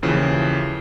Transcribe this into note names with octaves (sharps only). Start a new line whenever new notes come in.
D#2 C#3 E3 F3